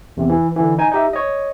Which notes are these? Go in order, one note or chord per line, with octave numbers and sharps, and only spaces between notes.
E2 C3
E3
D3 E3
D#4 G#5
D#4 G4 E5
C#5 D#5